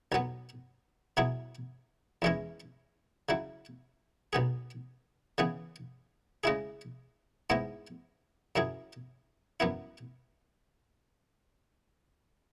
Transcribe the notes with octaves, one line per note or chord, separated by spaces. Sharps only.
B1 B2 F#3 B3
B2 F#3 E4 G#4
E2 E3 G#3 C#4 E4
C#3 F#3 E4
B1 B2 B3 G#4
C#3 E3 B3 G#4
C#3 G#3 E4 G#4
G#2 G#3 B3 E4
F#2 F#3 E4 G#4
F#2 F#3 B3 E4